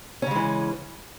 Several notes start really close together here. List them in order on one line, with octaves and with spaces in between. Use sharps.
C#4 C#3 G#3 E3